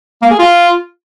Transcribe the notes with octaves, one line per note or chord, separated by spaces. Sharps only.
A#3
G#4
F4